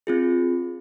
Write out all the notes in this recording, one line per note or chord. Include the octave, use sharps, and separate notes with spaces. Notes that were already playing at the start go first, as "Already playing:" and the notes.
C4 F4 G#4